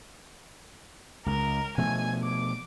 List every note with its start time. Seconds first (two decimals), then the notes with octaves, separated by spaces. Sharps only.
1.26 C#2 A#4
1.78 B2 F3 A3 G#5
2.24 D6